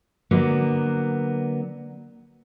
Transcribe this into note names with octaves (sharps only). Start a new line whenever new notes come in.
D3 F#3 A#3 B3 B4